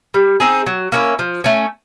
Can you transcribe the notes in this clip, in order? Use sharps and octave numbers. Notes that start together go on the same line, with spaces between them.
G3
C4 D#4 G#4
F#3
A#3 C#4 E4
F3
A3 C#4